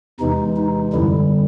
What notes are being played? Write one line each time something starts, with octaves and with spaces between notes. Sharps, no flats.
E2 C3 E3 G#3 D#4
D#4
F#2 D3 G3 E4